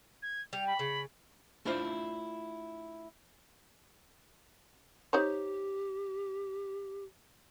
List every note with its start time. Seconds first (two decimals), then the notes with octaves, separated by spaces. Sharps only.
0.22 G#6
0.53 G3 F7
0.67 B5
0.79 C#3
1.65 A3 D4 E4 F4 C5 F5
5.13 D#4 G4 C5 C#5